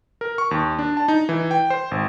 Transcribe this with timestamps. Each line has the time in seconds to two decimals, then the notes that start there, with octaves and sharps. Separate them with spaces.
0.21 A#4
0.38 C#6
0.51 D#2
0.79 D4
0.97 A5
1.08 D#4
1.29 E3
1.51 G5
1.70 C5
1.91 G#1